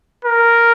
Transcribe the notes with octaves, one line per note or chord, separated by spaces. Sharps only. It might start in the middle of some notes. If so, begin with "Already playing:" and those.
A#4